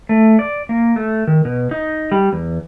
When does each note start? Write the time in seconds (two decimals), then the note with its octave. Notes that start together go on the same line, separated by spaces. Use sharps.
0.09 A3
0.39 D5
0.69 A#3
0.96 A3
1.27 D#3
1.45 B2
1.71 D#4
2.12 G3
2.33 E2